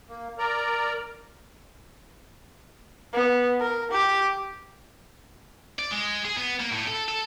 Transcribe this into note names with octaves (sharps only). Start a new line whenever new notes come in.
A#3
A#4 D5 A#5
B3
A#4
G4
D5
G#3
G#4
B3
A#3
A2
A4
A4